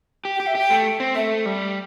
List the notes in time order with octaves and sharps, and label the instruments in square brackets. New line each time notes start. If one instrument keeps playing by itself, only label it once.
[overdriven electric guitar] G4
[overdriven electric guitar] G4 [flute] G5
[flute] E5
[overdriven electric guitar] G4 [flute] G5
[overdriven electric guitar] A3
C4
[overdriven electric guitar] A3 [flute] E5
[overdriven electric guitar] G3